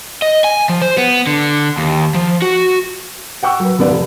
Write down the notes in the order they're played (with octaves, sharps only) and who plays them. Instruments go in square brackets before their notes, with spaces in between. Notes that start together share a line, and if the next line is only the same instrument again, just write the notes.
[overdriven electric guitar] D#5
G#5
F3
C5
B3
D3
D#2
F3
F#4
[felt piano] F#5 G5 C#6 E6
F#3 B4
D#2 B3 D5
F1